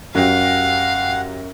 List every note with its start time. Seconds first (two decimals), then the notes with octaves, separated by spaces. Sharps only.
0.15 F#2 F#3 G4 F5 F#5